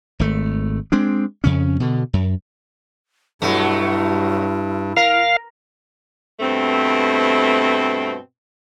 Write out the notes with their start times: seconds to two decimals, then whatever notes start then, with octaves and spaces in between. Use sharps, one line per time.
0.19 G#1 A3
0.92 G#3 C4 D4
1.44 F2 C#3 C#4
1.80 B2 D3
2.13 F#2
3.42 G2 B2 F#3 A3 E4
4.97 A#4 F5
6.40 G2 B2 A3 C4